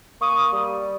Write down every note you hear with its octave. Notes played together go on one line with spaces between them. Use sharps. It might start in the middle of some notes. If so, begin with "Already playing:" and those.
A#3 C#6 D#6
G3